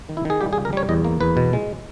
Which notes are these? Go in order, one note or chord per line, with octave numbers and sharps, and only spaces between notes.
D#3
E4
D#3 G#4
G3 G4
G#4
C#2
A#4
G3 C#5
E2 D#5
A#3
E2 B4
B2
G#3